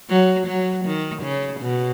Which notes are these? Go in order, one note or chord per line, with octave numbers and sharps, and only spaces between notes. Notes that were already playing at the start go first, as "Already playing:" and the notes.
F#3
F#3
D#3
C#3
B2